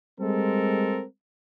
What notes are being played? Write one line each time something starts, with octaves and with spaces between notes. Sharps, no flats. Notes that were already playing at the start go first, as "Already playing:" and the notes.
G3 G#3 C4 A4 A#4